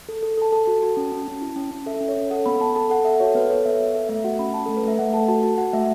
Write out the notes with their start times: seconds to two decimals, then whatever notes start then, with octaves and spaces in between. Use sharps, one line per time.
0.09 A4
0.23 A4
0.37 A4 A5
0.52 A4 A5
0.67 F#4
0.83 F#4
0.97 C#4
1.12 C#4
1.27 C#4
1.42 E4
1.56 C#4
1.71 C#4
1.86 A4 E5
2.01 C#4
2.09 C#5
2.17 C#4
2.31 A4 F#5
2.46 B3 B5
2.61 B3 A5
2.76 A4 A5
2.90 A4 F#5
3.05 A4 E5
3.20 F#4 C#5
3.35 B3 B4
3.50 A4 C#5
3.66 B3 E5
3.80 B3
3.87 E5
3.95 A4
4.09 A3 E5
4.24 F#4 F#5
4.39 C#4 B5
4.54 C#4 A5
4.66 A3 A4
4.77 B4
4.84 A3 E5
4.99 A3 F#5
5.14 A4 A5
5.28 F#4 A5
5.43 F#4 A5
5.58 F#4 F#5
5.73 A3 E5